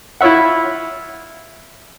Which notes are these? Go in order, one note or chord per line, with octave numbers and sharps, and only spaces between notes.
E4 F4 C#5 E5 F#5